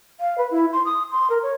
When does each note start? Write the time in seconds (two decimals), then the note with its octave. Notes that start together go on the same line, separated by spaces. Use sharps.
0.20 F5
0.38 B4
0.51 E4
0.73 C6
0.85 D#6
1.12 C6
1.30 A#4
1.43 C#5